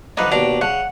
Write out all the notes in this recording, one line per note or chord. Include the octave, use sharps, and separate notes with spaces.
D3 F3 D4 D#4 B4
D#2 B2 D4 A#5
C#3 F#5